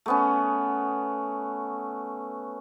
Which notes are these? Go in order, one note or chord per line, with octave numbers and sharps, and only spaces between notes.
A3 B3 C#4